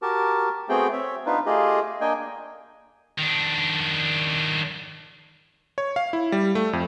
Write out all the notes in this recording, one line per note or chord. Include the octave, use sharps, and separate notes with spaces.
F#4 G4 A#4 A5
A3 B3 C4 F#4 G#4 G5
C4 C#5 E5
B3 D4 D#4 F4 B4
A3 F4 G4 G#4 D#5
A#3 D4 D#5 G5 G#5
D#3 D4
C#5
F5
E4
G3
A3
F2